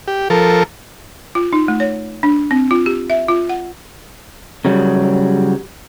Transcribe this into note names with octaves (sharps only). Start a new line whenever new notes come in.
G4
F3 A4 A#4
F4
D#4
A3
C#5
D4
C4
F4
G4
E5
F4
F#5
C#3 F#3 G3